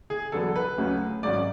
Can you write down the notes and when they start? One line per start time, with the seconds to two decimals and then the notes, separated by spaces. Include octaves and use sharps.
0.10 G#4
0.32 E2 D3 F#3 B3 A4
0.56 B4
0.78 D2 C#3 F#3 A3 C#4
1.23 G#1 G#2 F#3 C#4 D5